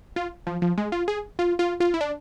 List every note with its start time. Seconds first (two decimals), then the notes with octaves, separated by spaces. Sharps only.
0.16 F4
0.47 F3
0.62 F3
0.78 G#3
0.92 F4
1.08 G#4
1.39 F4
1.59 F4
1.80 F4
1.94 E4
2.01 D4